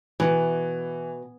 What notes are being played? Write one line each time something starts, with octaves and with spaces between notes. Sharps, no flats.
B2 E3